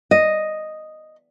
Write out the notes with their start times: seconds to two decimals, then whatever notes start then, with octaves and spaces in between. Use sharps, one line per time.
0.11 D#5